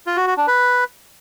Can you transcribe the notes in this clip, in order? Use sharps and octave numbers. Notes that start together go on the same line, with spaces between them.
F4
F#4
F#4
D4
B4